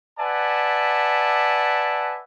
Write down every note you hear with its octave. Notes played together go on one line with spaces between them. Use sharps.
B4 D5 E5 F#5 G#5 A5